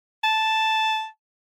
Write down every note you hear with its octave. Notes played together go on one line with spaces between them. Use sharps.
A5